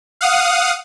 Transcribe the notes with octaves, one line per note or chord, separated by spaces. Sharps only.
F5 F#5 D#6